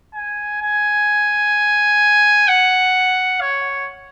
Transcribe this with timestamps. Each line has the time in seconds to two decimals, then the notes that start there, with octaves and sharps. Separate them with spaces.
0.15 G#5
0.62 G#5
2.48 F#5
3.41 C#5